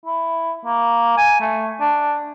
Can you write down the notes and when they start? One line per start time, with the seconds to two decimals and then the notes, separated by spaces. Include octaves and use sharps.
0.06 E4
0.65 A#3
1.17 G#5
1.40 A3
1.80 D4